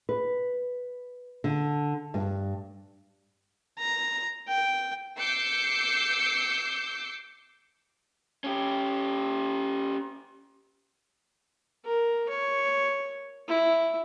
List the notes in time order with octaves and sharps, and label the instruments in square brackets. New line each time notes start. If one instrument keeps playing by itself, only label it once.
[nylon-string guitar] B4
D3
G2
[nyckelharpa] A#5
G5
[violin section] D6 E6 G6 C7 C#7
[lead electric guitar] C#4 G4
[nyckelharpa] A#4
C#5
E4